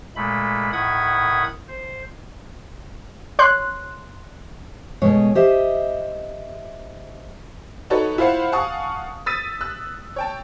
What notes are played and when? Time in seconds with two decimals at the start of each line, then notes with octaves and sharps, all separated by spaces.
0.16 A#2 G#3 A3 B5
0.73 A2 D#3 F#5 B5 D#6 G#6
1.68 C5
3.39 C#5 C6 F#6
5.01 B2 G#3 A3 C#5 D#5
5.35 G4 C5 D#5 E5
7.90 D#4 F#4 A4 B4 C#5
8.18 E4 F4 C5 F5 F#5
8.52 F5 F#5 G#5 A5 C#6 D#6
9.26 D#6 E6 A6 B6 D#7
9.61 E6 F#6
10.16 C#5 G5 A5